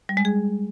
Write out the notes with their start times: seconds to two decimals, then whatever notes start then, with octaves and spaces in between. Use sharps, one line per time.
0.09 G3
0.17 G#3
0.25 G#4